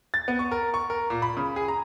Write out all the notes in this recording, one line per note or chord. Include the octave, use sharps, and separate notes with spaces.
A6
B3
C#6
A#4
C#6
A#4
A#2
B5
C#3
G#4
A#5